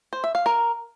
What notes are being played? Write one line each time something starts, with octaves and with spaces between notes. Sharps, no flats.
C5
E5
F5
A#4